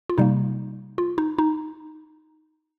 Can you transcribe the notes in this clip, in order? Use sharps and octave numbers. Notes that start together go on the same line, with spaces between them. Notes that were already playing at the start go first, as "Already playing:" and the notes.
F4
C3 G3 A#3 D#4
F4
D#4
D#4